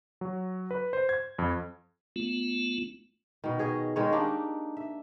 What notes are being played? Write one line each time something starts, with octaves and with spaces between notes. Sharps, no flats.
F#3
B4
C5
G#6
F2
A3 B3 F4
B2 D#3
G#4 C#5 D#5
D#3 G#3 C#4 C#5
A#3 D4 D#4 G4
E5